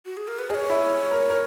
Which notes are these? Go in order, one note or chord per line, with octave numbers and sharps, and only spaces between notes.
F#4
G#4
A#4
B4
G#4 C#5 D#5
E4
A#4
A#4